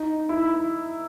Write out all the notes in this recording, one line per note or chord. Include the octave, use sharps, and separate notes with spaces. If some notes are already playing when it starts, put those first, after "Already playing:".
Already playing: D#4
E4